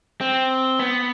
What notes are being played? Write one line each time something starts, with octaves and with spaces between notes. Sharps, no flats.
C4
B3